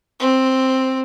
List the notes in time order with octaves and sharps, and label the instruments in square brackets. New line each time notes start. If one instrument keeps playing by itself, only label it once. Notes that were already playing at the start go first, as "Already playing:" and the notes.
[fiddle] C4